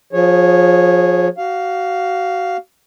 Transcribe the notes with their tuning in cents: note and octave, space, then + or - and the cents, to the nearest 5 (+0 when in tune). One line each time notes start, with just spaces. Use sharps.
F3 +25 G#4 +0 C#5 -10
F#4 +25 F5 +0